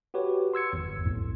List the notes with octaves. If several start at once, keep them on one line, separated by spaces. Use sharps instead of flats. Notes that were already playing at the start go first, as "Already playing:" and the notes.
F#4 G4 B4 C#5
C6 E6 G#6 C#7
G1 E2
B1 F2 A2